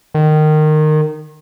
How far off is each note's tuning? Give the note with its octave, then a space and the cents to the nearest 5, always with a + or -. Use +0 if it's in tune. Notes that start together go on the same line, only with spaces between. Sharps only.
D#3 -20